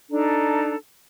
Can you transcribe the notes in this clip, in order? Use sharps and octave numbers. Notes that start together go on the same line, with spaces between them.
D4 D#4 A4 A#5